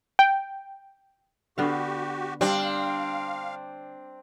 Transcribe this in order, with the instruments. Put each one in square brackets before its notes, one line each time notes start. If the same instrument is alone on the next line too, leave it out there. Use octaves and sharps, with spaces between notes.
[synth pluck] G5
[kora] D3 B3 F5 [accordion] F#4 G4
[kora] G3 [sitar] C4 D4 [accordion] F5